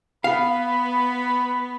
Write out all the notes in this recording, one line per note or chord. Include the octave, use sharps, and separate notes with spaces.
B3 B4 F5 B5